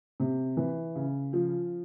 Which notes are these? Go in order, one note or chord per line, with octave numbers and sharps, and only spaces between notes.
C3
E3
C#3
F3